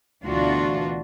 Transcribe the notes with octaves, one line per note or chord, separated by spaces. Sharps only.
D2 B2 E3 D4 F4 F#4